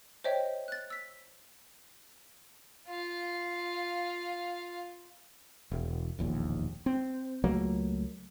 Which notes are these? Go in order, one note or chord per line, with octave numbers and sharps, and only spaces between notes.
C5 C#5 D#5 E5 G5
F#6 A6
E6 B6
F4 F5
E1
E1 A#1 D#2
C4
C#2 F#3 A3 A#3